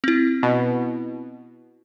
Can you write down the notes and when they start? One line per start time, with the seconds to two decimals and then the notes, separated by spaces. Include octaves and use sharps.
0.04 C4 E4
0.43 B2